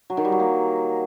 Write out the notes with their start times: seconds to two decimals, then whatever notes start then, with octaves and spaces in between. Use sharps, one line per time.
0.10 F#3
0.17 D#3
0.25 G3
0.32 F#3
0.40 A#3